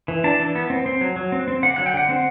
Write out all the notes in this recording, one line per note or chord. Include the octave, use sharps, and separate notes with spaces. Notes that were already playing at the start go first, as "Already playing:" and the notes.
E3
D4 A5
E3
B3
C4
C4
F#3
F#3
C4
C4
D3 F#5
F#3 F#5
G5
D3 F#5
C4